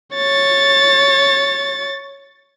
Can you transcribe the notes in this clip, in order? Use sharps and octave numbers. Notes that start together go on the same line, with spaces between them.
C#5 A6